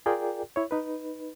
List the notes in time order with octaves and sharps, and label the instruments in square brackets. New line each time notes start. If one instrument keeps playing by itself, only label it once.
[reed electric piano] F4 G#4 A#4 D5 G5
E4 C#5
D#4 B4